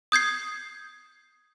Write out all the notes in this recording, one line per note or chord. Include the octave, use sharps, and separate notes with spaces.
D#6 G6 G#6 C7